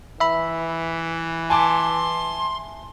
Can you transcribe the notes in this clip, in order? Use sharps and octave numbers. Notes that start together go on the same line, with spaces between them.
E3 E5 B5
G#5 A5 C6 D6